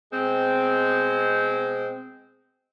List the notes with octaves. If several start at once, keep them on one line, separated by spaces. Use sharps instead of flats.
B2 G#3 C4